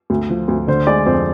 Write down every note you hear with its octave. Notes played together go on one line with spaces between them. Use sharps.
D2
F3
D2
D3 C5
G#3 D5
F2 C5